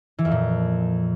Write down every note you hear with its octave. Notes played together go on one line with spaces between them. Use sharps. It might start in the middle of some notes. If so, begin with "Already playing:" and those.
E3
F2
A#2